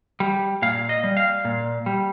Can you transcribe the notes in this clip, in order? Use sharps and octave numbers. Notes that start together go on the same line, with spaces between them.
G3
A#2 F5
D#5
G3
F5
A#2
G3